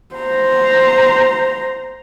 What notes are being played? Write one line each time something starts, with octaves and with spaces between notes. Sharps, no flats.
C5 A#5